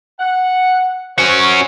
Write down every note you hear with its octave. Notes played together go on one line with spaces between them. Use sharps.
F#5
C#4 F#4 C5 C#5